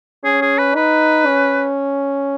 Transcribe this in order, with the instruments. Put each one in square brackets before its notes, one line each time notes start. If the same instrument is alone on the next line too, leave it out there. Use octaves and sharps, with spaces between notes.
[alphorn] C#4 [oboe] G#4
[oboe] G#4
B4
[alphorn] D#4 [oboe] B4
[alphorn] C#4